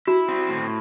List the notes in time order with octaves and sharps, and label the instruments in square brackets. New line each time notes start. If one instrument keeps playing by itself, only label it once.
[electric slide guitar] E4 [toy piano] F#4
[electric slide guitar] C4
A2